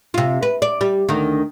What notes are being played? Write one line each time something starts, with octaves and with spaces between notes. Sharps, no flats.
C3 F4
B4
D5
G3
D2 D#3